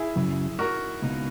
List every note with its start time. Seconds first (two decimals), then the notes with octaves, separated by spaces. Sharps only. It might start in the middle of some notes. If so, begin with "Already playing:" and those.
Already playing: E4 G#4
0.16 F#2 C#3 F#3
0.59 F#4 A#4
1.02 C#2 B2 A#3 D#4